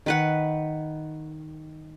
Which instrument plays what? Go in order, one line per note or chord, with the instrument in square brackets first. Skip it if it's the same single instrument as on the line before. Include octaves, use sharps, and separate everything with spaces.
[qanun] D#3 B4 F#5